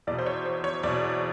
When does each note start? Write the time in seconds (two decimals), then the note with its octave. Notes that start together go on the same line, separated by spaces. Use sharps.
0.07 E2 D5
0.11 B2
0.19 C5
0.26 C#5
0.46 C5
0.64 C#5
0.83 E2 B2 D5